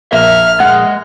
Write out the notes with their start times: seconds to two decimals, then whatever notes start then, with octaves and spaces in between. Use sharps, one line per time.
0.13 A#1 A#3 E5 F6
0.60 G#3 F#5